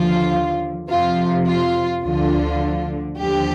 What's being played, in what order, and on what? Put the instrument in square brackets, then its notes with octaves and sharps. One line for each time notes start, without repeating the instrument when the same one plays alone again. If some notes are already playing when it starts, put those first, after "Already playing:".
Already playing: [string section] D#2 D3 F3 F4
F2 C3 F3 F4
F4
D2 D3 F3 F4
D#2 D3 F3 G4